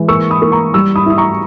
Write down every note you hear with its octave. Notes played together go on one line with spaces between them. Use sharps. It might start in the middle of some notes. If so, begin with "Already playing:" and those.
Already playing: E3 G#3
A#3 C#6 E6
B5 D#6
A#3
A#5 C#6
G3 C#6 E6
B5 D#6
E4 D#6
A#5 C#6